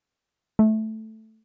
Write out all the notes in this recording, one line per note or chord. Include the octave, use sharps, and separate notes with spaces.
A3